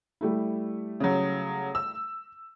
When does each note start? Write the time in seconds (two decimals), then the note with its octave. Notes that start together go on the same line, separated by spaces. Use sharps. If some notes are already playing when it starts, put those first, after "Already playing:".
0.21 G3 A3 E4
1.00 C#3 F#3
1.75 E6